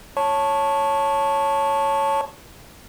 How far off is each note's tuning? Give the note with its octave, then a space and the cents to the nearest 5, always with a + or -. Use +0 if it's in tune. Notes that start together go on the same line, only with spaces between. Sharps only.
C#5 +0 A5 +0 C#6 -10